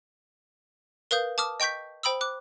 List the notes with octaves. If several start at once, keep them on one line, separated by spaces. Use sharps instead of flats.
A#4 B4 F5 D#6 G6
A5 D6 D#6 F6
D#5 G5 C#6 G6 B6
C5 G5 B5 D#6 E6
D6 F#6